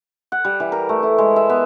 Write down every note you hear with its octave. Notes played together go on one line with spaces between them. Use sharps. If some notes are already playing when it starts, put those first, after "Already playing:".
F#5
G3
E3
A#4
A3
E4
G#3
E5
B3